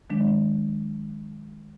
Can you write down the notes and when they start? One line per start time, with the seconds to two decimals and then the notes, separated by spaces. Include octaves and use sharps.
0.10 D#3 F#3 G#3 D4